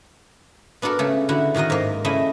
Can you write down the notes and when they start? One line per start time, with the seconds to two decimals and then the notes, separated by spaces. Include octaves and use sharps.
0.82 B3 D4 F#4 A4 A#4
0.99 C#3 A3 A4
1.29 D3 E4 F#4
1.55 A2 D#3 F#4 A#4 D#5
1.70 G#2 A#3
2.04 C#3 A3 E4 D#5 G#5